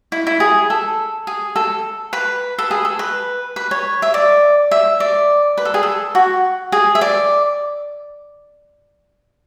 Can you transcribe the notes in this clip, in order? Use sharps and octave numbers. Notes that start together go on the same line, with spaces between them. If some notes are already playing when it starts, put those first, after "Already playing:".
E4
E4
G#4
A4
G#4
A4
B4
A4
G#4
A4
B4
B4
C#5
E5
D5
E5
D5
B4
A4
G#4
A4
F#4
G#4
E5
D5